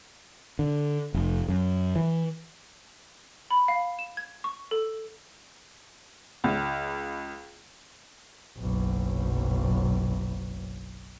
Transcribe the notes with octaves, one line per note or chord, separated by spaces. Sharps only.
D3
F1
F#2
E3
B5
F5
E7
G#6
C#6
A4
C#2
F#1 B1